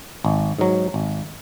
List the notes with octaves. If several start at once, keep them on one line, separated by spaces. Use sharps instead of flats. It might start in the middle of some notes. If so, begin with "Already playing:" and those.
G#1
G#2 F#3
G#1